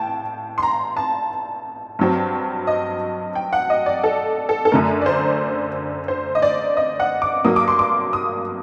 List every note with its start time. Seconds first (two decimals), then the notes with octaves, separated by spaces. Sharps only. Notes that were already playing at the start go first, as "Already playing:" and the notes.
Already playing: A2 G5 A5
0.58 C6
0.63 A#5
0.97 A5
1.99 G2 F#3 C4
2.67 D#5
3.35 G5
3.53 F#5
3.70 D#5
3.86 D5
4.04 A4
4.49 A4
4.65 A4
4.71 F#2 D3 A3 A#4
5.02 D5
5.06 C5
6.08 C5
6.35 D#5
6.42 D5
6.77 D#5
7.00 F#5
7.22 D6
7.45 G2 F#3 A#3 D#6
7.56 D6
7.68 C6
7.79 D6
8.13 D#6